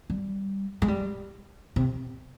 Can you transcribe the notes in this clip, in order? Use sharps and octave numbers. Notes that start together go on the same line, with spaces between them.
G3
G#3
G3
C3